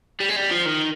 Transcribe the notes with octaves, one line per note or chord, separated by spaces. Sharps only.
G3
G#3
G3
F3
D#3